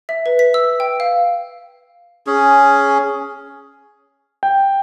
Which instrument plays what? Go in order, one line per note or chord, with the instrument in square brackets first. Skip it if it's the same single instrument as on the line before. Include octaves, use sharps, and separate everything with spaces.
[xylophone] E5
B4
B6
E6
G5
F5
[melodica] C#4 G#4
[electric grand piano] G5